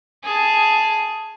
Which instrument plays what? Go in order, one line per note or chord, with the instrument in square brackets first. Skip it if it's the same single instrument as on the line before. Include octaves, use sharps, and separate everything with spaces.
[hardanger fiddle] G#4 A5